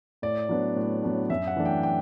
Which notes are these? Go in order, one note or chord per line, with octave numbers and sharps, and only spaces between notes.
A2 D5
F#3 B3 D4
A2
F#3 B3 D4
F#2 E5
F#5
E3 A3 D4
G5
G5